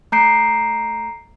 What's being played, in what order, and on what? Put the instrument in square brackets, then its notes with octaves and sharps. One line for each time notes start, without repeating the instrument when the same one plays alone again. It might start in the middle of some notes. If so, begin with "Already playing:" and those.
[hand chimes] A3 A#5 G6 C7 D7